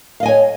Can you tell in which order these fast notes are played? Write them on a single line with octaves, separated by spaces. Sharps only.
F5 D#5 G#5 C#5